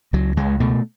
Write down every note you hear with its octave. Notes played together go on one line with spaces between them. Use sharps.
C#2 F#3
C#2 G#3
B2 A3